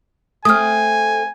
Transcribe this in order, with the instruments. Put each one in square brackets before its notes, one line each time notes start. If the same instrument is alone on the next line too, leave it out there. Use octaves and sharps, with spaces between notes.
[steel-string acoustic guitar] A3 C4 [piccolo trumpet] G#5 [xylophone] D#6 F6